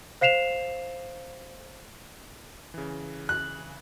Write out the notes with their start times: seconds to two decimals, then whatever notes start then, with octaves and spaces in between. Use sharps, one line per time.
0.21 C5 F5 C7 E7 F7
2.74 C#3 E3
3.29 F#6